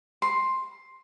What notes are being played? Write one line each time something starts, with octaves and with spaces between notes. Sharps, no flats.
C6